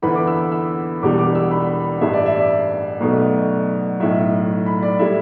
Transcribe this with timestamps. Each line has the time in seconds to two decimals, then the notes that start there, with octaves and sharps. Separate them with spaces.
0.02 E2 D3 B3 E4 B5
0.15 D6
0.27 E6
0.52 E6
1.02 E1 E2 B2 G3 D4 D6
1.18 D6
1.35 E6
1.51 B5
2.01 A1 G2 G3 E5
2.13 D5
2.26 E5
2.38 D5
3.01 B1 B2 A3
4.00 B1 A2 A3 E5
4.66 B5
4.82 D5
4.99 A2 G3 E4 E5